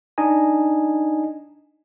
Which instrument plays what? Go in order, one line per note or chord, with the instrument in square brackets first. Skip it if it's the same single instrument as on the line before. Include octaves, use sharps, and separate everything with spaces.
[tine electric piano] D4 D#4 D#5 G#5